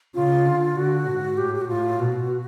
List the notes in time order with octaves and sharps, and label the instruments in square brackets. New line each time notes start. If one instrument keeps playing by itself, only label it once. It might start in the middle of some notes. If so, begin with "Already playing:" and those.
[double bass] C#3 [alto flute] F4
[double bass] D3
[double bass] D3 [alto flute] F#4
[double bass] G#2
[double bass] A2 [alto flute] G4
[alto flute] G4
F#4
[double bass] A2 [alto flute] F4
[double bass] B2 [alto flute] F#4